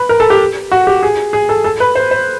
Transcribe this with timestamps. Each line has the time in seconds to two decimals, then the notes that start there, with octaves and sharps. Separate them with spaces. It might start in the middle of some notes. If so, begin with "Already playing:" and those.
Already playing: B4
0.09 A#4
0.20 A4
0.30 G4
0.72 F#4
0.87 G4
1.03 G#4
1.33 G#4
1.49 A4
1.64 A4
1.80 B4
1.95 C5
2.11 C5